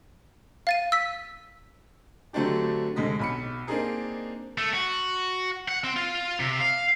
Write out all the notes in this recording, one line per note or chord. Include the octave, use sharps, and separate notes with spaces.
F5 A6 D#7
E6 B6
D3 F#3 A3 C4 D4 G4
F1 D3 G#3 D#5 B6
B1 B5 C#7
A#3 C4 D4 D#4 G#4 A#4
A3
F#4
F#5
C4
F4
C3
F5